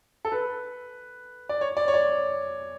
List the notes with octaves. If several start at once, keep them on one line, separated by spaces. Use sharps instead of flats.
A4
B4
D5
C#5
D5
C#5
D5